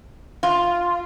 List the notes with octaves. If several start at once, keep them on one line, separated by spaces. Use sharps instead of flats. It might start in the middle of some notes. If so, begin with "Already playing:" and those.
F4